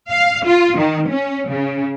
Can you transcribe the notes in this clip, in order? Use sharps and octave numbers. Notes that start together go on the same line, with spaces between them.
F5
F4
D#3
C#4
C#3